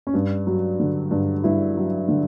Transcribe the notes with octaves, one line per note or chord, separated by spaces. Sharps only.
C#4
G2 D4
F#3
D3
G2
G2 E4
F#3
D3